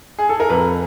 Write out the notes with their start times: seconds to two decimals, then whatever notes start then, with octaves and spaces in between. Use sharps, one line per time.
0.19 G#4
0.29 A4
0.40 A#4
0.50 F2 B4